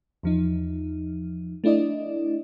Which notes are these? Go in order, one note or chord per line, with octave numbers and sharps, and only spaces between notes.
E2 F3 D#4
A3 D4 E4 D5 D#5